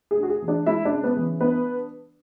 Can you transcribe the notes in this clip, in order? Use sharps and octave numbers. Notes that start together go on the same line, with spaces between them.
G#4
D4
F#4
G#4
E3
D4 D5
G#3 E4 E5
D4 D5
C#3
B3 B4
E3
B3 D4 B4